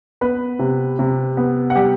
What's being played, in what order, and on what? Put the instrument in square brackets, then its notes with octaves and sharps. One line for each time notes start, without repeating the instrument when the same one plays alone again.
[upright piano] B3 B4 B5
C3
C3
B3
F#5
G3 G4 G5